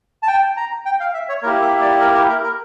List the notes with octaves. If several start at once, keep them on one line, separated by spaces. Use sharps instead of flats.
A5
G5
A#5
G5
F5
E5
C#5
A#3 E4 G4 A#4
E5
D5
A#4
A#4
A#4
A#4